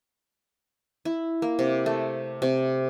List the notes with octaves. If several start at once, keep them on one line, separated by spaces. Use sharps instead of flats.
E4
A#3
C3
A3
C3